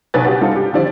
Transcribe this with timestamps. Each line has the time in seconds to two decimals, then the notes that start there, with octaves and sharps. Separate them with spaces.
0.14 B1 C#3 D#4 B4 G#5 A6
0.25 F#4 G4
0.41 G2 C3 D#4 F4 A4
0.56 G4
0.73 D3 D#3 F3 E4 G4 D5